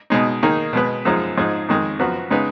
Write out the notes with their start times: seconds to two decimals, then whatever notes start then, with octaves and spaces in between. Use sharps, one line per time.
0.10 B2 G#3 D#4
0.43 D#3 A#3 D#4 G#4
0.73 B2 G#3 B3
1.05 F#2 F3 G#3 D#4 G#4
1.37 G#2 F3 G#3 D#4 G#4
1.69 F2 D#3 G#3
1.99 F#2 F3 B3 F#4
2.30 C#3 G#3 B3 D#4